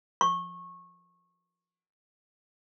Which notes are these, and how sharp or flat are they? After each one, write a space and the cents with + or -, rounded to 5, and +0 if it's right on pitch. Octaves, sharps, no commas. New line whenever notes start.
C#6 -20